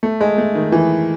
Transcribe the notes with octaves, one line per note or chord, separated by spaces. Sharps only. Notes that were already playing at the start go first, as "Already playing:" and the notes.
A3
G#3
A3
D#3
E3